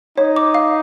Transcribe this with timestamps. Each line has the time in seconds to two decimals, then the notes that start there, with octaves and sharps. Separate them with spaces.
0.18 D#4 C#5
0.36 D6
0.55 F5